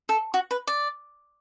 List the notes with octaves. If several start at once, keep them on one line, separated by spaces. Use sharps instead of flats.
A4
F#4
B4
D5